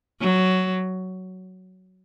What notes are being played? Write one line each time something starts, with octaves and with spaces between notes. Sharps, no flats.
F#3